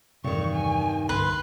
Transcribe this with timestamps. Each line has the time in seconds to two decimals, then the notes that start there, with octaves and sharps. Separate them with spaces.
0.24 E2 G2 C3 D#3 C#6
0.54 G#5
1.09 C2 G2 D3 B4 C6